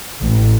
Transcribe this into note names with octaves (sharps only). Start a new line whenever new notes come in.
A1